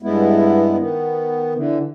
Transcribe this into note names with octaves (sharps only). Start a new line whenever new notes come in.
G2 G#3 B3 E4
D#3 B3
D3 E3